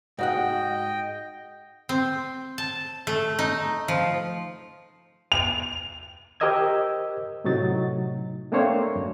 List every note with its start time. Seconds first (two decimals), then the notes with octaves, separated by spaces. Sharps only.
0.19 G#2 F#4 D#5 F#5 G5
1.89 C4
2.58 A5
3.07 A3
3.39 D#4
3.88 F3
5.32 F7
6.40 G4 A#4 C5 D#5 E6 G#6
7.44 A2 C3 F#3 D#4 A6
8.52 A3 A#3 C4 D4 C5 C#5
8.96 F#2